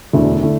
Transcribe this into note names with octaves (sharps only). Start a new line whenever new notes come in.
E1 D2 D3 A3 E4
D3 A3 E4